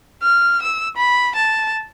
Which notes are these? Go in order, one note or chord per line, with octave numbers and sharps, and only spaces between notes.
F6
E6
B5
A5